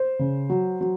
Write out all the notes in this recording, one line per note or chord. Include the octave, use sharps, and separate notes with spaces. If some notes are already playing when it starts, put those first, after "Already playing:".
Already playing: C5
C#3
F#3
F#3